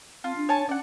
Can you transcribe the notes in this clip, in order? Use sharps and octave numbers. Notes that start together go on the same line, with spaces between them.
C4 F4
D4
C#5 G#5 A5
C#4 D5 F#5